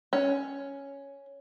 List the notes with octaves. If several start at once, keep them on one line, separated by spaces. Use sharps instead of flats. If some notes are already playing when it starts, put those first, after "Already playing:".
C#4